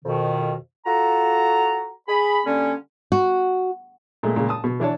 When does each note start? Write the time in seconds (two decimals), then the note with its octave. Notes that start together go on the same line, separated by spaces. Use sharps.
0.04 F2 B2 D#3
0.86 F4 F#4 A4 A#5
2.07 G#4 B5
2.46 D3 G3 A#3 C#4
3.12 F#4
4.23 A#2 G#3 A3
4.36 A#2 C#3 G#3
4.49 A5 D#6
4.64 B2
4.80 E3 D4 C#5 A5